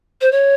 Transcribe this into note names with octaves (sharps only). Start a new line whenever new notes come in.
C5
C#5